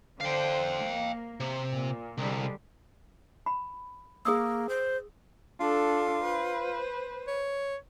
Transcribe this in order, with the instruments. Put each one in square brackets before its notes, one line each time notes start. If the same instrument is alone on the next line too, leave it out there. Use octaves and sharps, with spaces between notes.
[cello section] D3 C5 [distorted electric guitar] F5 G5
[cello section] A#3
[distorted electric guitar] C3
[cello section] A#2
[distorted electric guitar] C2 [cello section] D3 G3 G#3
[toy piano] B5
[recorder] A#3 [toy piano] G#4 D#6 E6
[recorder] C5
[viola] D4 A4 [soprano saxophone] F4
[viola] B4 C5
[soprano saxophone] C#5